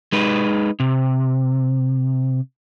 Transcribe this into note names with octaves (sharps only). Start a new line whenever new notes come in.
G#3 D#4 B4
C3